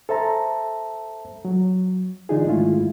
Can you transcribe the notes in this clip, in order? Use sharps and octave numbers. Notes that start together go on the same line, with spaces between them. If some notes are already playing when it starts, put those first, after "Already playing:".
A4 C5 E5 A5 A#5
F#3
D3 E3 D4 D#4 F4 G#4
G#2 D#3 G#3 A3 E4 F4